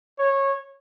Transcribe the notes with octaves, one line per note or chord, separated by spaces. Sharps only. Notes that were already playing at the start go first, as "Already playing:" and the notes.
C#5